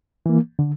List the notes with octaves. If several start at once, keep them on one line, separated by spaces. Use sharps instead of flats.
E3 A#3
D3